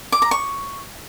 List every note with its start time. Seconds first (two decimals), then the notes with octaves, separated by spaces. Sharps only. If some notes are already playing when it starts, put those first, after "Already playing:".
0.12 D6
0.22 A#5
0.31 C#6